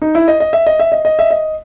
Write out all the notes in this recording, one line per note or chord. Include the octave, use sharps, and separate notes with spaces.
D#4
E4
D#5
D#5
E5
D#5
E5
D#5
D#5
E5
D#5